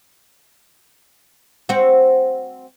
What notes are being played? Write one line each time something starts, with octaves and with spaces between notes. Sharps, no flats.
C4 F#4